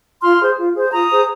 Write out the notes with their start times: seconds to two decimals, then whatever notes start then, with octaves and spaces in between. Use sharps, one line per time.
0.22 F4 C6 F6
0.40 G#4 C5
0.58 F4
0.75 G#4 C5
0.92 F4 A#5 D#6
1.10 G#4 C5